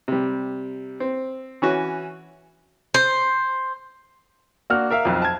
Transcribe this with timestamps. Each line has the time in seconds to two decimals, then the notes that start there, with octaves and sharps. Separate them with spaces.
0.08 C3 G3
1.00 C4
1.62 E3 C#4 F#4
2.94 C5
4.70 A#3 D4 F#4 F6
4.90 A#4 E5 F5
5.05 B1 F2
5.22 A5 G#6